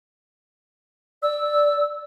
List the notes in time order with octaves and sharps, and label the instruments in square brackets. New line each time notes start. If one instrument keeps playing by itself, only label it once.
[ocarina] D5 [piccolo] E6